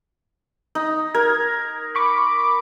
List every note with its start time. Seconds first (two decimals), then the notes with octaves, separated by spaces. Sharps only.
0.75 D#4
1.15 A#4 G#6
1.95 B5 C#6 D6